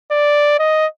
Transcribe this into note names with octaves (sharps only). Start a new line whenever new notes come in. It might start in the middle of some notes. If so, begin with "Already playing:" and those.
D5
D#5